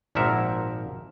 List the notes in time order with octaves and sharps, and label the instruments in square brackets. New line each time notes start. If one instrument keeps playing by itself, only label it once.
[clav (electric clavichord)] G#1 A#2 F3 A#4 E5 F#5